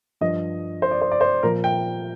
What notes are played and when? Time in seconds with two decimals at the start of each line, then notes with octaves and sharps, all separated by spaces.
0.21 G2 F3 D#5
0.82 C5
0.91 D5
1.01 C5
1.11 D5
1.21 C5
1.43 A#2 F3 A#4
1.64 G5